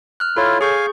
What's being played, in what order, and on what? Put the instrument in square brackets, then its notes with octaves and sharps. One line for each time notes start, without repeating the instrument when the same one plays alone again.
[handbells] F6 F#6
[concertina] E4 F4 [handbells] A4 C#5
[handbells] G#4 C#6 G6 [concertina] F5 G#5